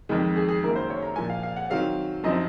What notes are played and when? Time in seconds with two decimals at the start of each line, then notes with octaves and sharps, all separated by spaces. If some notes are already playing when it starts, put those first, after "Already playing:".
0.09 F2 D#3 G#3
0.36 G#4
0.49 G#4
0.63 F#2 D#3 A#3 A#4
0.76 C5
0.90 C#5
1.02 A#5
1.16 A#2 F3 A#3 G#5
1.30 F5
1.43 F5
1.57 F#5
1.70 D#3 F#3 C4 F5
2.24 F#2 F3 C4 D#4 D#5